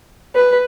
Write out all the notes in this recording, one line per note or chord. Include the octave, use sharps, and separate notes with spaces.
B4